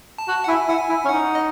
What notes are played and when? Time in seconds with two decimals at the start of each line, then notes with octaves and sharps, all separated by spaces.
0.18 A5
0.28 F#4
0.44 F#5
0.48 E4 G#5
0.68 E4 F#5
0.78 G#5
0.89 E4
1.05 C#4
1.08 D#4 F#5
1.35 D#5